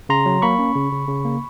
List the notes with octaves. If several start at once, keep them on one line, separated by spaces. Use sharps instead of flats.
C#3 A#5 C6
F#3
A#3 B5 C#6
C#4
C#3
C#3
C#3
A#3